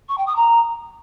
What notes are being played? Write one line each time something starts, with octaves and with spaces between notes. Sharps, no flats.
C#6
G5
D#6
A#5